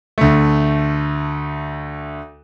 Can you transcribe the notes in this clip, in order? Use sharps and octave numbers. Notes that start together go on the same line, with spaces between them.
D2 A3